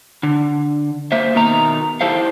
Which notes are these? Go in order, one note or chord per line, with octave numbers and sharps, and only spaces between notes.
D3
A#3 C5 E5
B2 D#3 A#5
E4 G4 A4 C5 F5